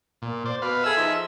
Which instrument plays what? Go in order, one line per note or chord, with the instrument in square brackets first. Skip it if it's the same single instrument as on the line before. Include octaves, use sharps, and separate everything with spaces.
[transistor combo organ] A#2
C5 D5
[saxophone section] B2 [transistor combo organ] B4 F5
[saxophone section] G#4 A4 [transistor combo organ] E5 E6
[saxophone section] F3 D#4